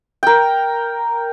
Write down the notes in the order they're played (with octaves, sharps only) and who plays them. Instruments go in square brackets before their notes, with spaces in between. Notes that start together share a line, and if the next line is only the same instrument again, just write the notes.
[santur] A#4 G5